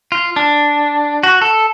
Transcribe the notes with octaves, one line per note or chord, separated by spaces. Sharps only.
F4
D4
F#4
A4